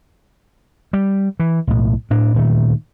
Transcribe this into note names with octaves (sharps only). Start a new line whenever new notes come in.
G3
E3
B1 A2
A2 D4
D2 A#2 D#3 A3